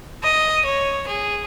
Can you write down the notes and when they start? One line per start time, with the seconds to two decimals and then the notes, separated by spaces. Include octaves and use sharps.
0.23 D#5
0.65 C#5
1.07 G#4